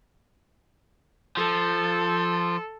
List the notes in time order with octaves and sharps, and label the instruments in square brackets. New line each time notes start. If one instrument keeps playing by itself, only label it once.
[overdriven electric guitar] F3 [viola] A4